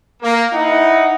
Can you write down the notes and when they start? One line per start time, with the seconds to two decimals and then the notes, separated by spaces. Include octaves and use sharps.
0.23 A#3
0.53 D#4 E4 F#5